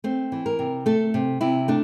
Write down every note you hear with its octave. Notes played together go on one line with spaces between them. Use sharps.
A3 C4
E3
A#4
C3
A3 A4
C3
C3 E4
A3 D4